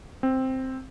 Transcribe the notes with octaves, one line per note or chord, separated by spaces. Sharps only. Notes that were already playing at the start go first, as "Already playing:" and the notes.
C4